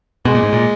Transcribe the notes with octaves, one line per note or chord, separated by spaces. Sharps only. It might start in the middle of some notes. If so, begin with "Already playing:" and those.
B2 G#3
A#2
G#2
A#2